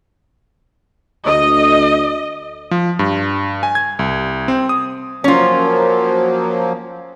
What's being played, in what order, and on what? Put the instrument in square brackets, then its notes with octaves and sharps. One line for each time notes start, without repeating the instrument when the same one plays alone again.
[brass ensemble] D2 [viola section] D#5
[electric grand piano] F3
G2
G#5
G#6
C2
C4
D#6
[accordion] F3 F#3 A#3 [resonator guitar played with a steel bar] C#4 F4